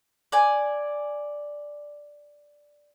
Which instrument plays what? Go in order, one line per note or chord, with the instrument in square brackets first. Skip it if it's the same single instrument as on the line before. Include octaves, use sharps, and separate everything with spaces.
[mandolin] D5 G#5